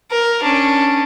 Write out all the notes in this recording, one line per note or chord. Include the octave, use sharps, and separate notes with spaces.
A#4
C#4 D4